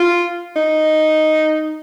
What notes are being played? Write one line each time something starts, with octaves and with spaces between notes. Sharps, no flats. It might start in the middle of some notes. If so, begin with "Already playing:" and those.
Already playing: F4
D#4